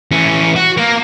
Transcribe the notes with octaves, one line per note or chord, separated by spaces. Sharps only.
E3 C#4
F#4
A#3 A#4